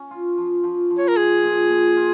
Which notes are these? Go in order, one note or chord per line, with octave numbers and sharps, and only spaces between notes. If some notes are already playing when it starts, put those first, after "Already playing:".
Already playing: C#4
F4
F3
F3
F3
C#5
A#4
F4 G#4
A#2
A#2
F4